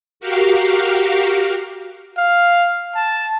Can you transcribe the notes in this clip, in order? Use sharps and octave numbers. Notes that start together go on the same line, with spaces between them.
F#4 G4 A#4 F5
F5
A5